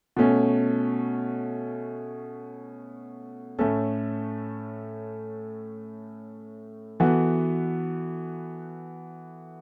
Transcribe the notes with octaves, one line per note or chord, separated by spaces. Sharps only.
B2 A3 C#4
A2 A3 C#4 A4
E3 B3 F#4 A4